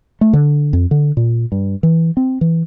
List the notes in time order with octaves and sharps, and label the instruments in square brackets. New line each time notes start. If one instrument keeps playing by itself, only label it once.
[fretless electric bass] A3
D3
F2
D3
A#2
G2
E3
C4
E3